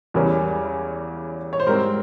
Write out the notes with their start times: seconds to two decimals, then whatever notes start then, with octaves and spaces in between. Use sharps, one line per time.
0.14 E2 C#3 E3 G3 C#4 A#4
1.53 C#5
1.60 C5
1.67 G#2 G3 C4 A#4